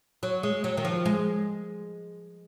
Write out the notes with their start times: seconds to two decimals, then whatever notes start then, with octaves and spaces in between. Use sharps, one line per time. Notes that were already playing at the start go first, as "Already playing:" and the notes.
0.23 F#3
0.43 G#3
0.64 F#3
0.77 D#3
0.85 F3
1.06 G#3